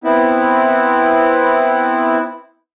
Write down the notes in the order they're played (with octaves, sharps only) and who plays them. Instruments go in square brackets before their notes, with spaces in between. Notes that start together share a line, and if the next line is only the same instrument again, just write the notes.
[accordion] B3 C4 E4